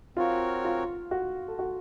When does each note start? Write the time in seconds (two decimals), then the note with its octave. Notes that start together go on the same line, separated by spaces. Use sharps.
0.17 C4 F4 F#4 A#4 C#5
0.65 F4
1.11 F#4
1.48 A4
1.59 F#4